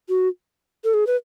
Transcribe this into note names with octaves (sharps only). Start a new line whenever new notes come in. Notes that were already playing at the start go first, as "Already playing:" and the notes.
F#4
A4
G#4
B4